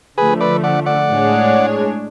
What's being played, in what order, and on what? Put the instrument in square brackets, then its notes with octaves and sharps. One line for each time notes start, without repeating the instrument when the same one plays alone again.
[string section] D3 F3 A3 [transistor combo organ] G#4 B4
[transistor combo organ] B4 D5
D5 F#5
D5 F#5
[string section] A2 G#3 D4 G#4 C#5